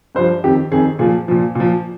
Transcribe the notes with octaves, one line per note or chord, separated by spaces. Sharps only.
G2 F3 C5
F2 D#3 G4
F2 D#3 G#4
A#2 F3 G#4
A#2 F3
A#2 F3